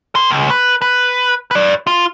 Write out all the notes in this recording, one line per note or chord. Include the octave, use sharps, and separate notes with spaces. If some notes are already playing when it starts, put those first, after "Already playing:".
A#4 C6
C#2
B4
B4
B4 D5
F4